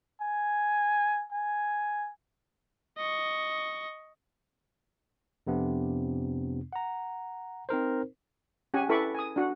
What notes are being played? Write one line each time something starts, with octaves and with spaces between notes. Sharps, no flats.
G#5
G#5
D#5 C#6
F2 C3 B3 D4
F#5 A#5
C4 D#4 A#4 C5
C#4 G4 F#5 G#5
E4 A4 B4 B5 C#6 D6
G#5 D#6
D4 F#4 F#5